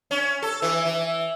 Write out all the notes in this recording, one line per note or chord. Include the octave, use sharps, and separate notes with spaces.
C#4
A4
E3
E3